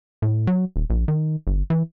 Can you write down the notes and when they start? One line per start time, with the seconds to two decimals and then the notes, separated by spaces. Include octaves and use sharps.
0.22 A2
0.47 F#3
0.76 D#1
0.90 A#1
1.08 D#3
1.47 G1
1.70 E3